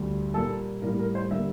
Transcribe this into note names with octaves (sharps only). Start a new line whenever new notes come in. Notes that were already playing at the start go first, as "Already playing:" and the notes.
Already playing: D2 D3 G3
A#2 G3 A#3 A4
A2 G3 A#3 A#4
A#4
C5
D3 G3 A#3 E5